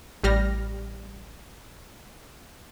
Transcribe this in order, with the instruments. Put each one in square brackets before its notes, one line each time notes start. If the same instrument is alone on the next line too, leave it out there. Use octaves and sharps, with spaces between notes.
[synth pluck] A1 G3 F6 A#6